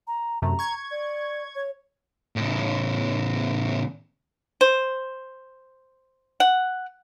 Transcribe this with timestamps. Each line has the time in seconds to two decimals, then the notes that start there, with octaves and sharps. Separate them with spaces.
0.07 A#5
0.42 F#2 C3 A3 A#5
0.59 C#6 G#6
0.91 D5
1.55 C#5
2.36 A2 C#3
4.61 C5
6.40 F#5